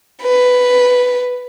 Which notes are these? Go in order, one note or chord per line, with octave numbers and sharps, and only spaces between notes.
B4